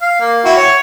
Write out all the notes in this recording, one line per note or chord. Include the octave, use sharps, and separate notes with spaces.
F5
A#3
E4 F#4 G5
C#5